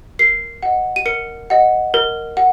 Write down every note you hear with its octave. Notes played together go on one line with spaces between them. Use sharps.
A#4 C7
D#5 F#5
D#7
A#4 C#7
D#5 F#5
A#4
F#5